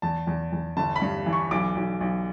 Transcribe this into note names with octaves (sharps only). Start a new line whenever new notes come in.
E2 A5
E2
E2
G1 A5
B5
G2
E3
C#6
B1 D6
B1
B1